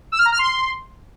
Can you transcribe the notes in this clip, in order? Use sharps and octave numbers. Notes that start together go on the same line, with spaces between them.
E6
F6
A#5
F6
C6